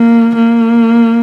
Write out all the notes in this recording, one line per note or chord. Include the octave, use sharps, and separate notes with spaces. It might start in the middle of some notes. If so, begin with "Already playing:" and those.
Already playing: A#3
A#3